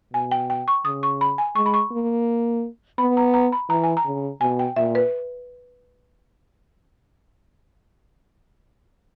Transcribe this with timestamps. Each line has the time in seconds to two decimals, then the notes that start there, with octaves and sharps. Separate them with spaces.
0.13 B2 G#5
0.31 G5
0.50 G5
0.68 C#6
0.85 C#3 D#6
1.03 C#6
1.21 B5
1.38 G#5
1.56 G#3 C#6
1.66 B5
1.74 C#6
1.92 A#3
2.98 B3 B5
3.17 A#5
3.34 A#5
3.52 B5
3.69 E3 A#5
3.84 G#5
3.97 A#5
4.05 C#3
4.41 B2 G#5
4.59 G5
4.76 A#2 E5
4.95 B4